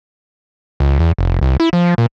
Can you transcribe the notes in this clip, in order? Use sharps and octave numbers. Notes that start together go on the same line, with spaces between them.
C#2
E2
F1
C2
E4
F3
A#2